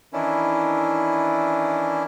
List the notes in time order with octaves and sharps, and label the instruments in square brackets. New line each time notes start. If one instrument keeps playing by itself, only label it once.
[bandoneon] D#3 E3 C#4 D4 E4